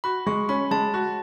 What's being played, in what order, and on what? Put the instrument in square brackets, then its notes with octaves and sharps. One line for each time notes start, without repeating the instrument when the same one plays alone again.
[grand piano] F#4 [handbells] B5
[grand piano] G#3 [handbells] C#6
[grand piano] C#4 [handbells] B5
[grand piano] G#3 [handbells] A5
[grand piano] F#4